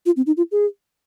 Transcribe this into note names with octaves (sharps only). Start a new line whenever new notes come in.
F4
C4
D#4
F4
G#4